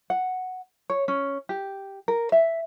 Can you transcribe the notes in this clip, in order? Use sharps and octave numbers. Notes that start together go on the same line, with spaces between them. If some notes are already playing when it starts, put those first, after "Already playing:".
F#5
C#5
C#4
G4
A#4
E5